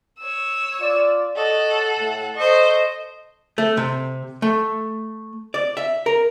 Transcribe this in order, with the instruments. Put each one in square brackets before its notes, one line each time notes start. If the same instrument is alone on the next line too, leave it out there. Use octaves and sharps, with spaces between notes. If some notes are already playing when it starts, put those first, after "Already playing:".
[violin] C#5 E6
[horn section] F4 D5
[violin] A4 F#5 [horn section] C#5 D#5
[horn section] A2
[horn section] A4 D#5 [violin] C5 C#6
[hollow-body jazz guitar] A3
C3
A3
D5
E5
A#4